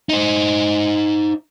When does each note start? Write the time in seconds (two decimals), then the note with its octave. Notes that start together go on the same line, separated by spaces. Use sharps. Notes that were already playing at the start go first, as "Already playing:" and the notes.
0.09 D#4 C5